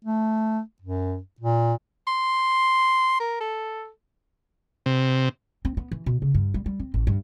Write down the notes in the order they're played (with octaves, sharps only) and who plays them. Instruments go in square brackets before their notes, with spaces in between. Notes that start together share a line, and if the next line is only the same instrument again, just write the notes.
[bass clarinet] A3
F#2
A#2
[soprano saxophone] C6
A#4
A4
[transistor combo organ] C3
[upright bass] C4
B3
E3
B2
C#3
G2
G3
G3
C4
A1
G2